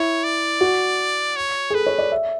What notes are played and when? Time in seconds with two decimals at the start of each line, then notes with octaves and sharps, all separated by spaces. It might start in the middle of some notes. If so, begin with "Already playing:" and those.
Already playing: E4 C#5
0.24 D5
0.61 F#4
1.36 C#5
1.70 G#4
1.74 A4 B4
1.86 C#5
1.99 D5
2.12 E5